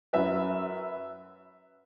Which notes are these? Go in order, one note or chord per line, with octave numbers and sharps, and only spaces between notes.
F#2 F#3 B4 E5